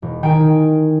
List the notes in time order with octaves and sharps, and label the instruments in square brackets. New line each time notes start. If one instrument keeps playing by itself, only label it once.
[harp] E1
D#3 G5 G#5 D7